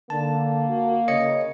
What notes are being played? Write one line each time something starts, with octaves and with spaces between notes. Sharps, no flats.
D3 A#3 A5
F#4
C#3 C#5 D#5 C#7